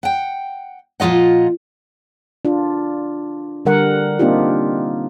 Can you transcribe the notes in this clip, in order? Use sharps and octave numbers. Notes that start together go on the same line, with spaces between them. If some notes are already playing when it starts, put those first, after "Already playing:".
F#5 G5
A#2 F3 F4 D#5 F#5
D4 F4
D3 G3 A#4 F#5
A#3 C4 D4 D#4 F4 G4